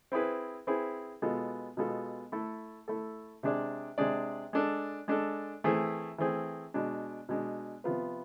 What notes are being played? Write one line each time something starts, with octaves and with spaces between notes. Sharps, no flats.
C4 E4 G#4 B4
C4 E4 G#4 B4
B2 G#3 B3 F4 A4
B2 G#3 B3 F4 A4
A3 E4 A4
A3 E4 A4
C3 G#3 D4 G#4 D5
C3 G#3 D4 G#4 D5
G#3 D4 A4
G#3 D4 A4
E3 A3 C4 G#4
E3 A3 C4 G#4
B2 G#3 D4
B2 G#3 D4
C3 F3 B3 F4 B4